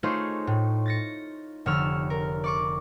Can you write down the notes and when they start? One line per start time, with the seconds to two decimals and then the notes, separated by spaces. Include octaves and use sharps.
0.03 A3 D#4 F4 G#4 C5 C#5
0.47 A2
0.86 A6 A#6 C#7
1.66 F1 D3 C#5 E6 F6
2.10 A#4
2.44 D5 C#6 D6